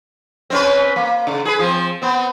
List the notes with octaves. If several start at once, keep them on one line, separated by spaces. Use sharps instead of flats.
C4 C#4 B4
A#3
C#3
G#4 B4
F3 C4
B3 C4